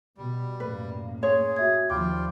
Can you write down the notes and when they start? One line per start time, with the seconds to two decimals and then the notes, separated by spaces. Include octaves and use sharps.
0.18 B2 G3
0.60 F#2 A2 A#3 B4
1.23 G#4 C#5 C6
1.57 F#4 E5 G#6
1.90 D#2 F3 G3 F4 G5 D6